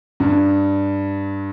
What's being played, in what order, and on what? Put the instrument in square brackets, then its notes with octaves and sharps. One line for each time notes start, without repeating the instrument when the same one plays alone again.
[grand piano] G2